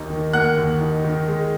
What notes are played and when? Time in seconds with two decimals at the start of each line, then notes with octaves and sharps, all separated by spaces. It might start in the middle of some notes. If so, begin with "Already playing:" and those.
Already playing: D#2 A#3 D#4
0.10 D#3
0.33 A#3 F#5 F#6
0.57 D#2
0.81 D#4
1.04 D#3
1.28 G#3